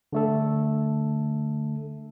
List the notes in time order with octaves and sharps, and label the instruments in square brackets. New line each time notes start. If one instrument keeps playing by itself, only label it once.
[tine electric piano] D3 A3 A4